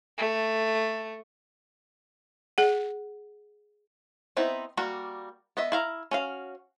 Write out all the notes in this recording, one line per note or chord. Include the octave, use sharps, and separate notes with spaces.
A3
G#4 F#5
B3 C4 D#4 E4
G3 A#3 F#4
B3 D#5 E5
E4 F5 A#5
C#4 F#4 F5